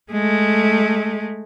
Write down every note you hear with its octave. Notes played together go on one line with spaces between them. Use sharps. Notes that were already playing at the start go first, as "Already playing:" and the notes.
G#3 A3